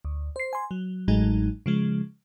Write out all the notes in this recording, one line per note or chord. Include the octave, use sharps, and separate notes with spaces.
D2
C5 C7
G#5 C6
F#3
A1 A2 F#3 G#3 D#4
C#3 F3 G#3